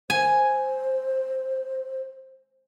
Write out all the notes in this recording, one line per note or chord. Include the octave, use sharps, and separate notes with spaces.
C5 G#5